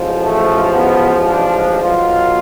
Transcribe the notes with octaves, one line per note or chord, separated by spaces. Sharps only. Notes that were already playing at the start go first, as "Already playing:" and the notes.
Already playing: A1 G#2 F3
A3
B3
D4
B1 B2 F#3 F4